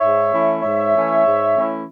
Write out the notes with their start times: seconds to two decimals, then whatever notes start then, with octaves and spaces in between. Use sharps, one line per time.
0.01 G#2 C#5 E5
0.31 E3 A3 C#4 E4
0.62 G#2 C#5 E5
0.92 E3 A3 C#4 E4
1.24 G#2
1.53 E3 A3 C#4 E4